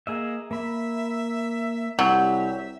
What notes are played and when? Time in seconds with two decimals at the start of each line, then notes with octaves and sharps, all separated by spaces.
0.07 A#3 G#4 D#5 E5
0.51 A#3 E5 B5
1.99 C2 F#3 G4 E5